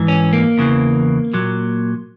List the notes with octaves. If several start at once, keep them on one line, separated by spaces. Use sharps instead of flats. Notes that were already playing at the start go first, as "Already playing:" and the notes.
Already playing: G#2 E3
C#4
A#3
E2 C#3 E3
A#2 F#3